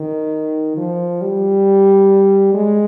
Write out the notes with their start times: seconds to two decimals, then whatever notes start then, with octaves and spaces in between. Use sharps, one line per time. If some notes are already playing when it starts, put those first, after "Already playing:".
Already playing: D#3
0.77 F3
1.21 G3
2.54 G#3